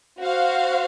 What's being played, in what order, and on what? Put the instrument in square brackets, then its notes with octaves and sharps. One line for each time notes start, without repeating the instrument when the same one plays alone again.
[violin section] F#4 C5 F5